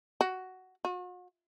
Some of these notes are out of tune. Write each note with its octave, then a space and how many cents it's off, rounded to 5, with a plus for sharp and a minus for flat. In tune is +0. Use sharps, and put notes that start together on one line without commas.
F#4 +10
F#4 -45